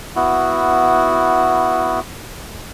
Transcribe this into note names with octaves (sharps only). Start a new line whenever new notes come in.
B3 E4 F#4